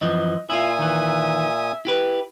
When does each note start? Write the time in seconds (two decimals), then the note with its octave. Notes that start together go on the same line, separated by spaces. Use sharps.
0.01 F#2 E3 F3 D#5
0.50 A#2 E4 F4 E5 G#5 D#6
0.79 D#3 E3
1.85 E4 G4 B4